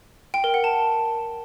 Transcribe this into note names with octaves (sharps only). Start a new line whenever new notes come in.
G5
A#4
F#5
A5